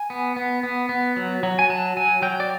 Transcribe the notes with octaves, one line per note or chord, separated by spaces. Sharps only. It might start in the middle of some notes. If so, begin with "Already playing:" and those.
Already playing: G#5
B3
B3
B3
B3
F#3
F#3
G#5
F#3 A5
F#3 G#5
F#3 G5
D5